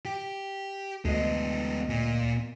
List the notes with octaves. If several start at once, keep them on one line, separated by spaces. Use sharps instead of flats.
G4
D2 G#3 B3 D#5
A#2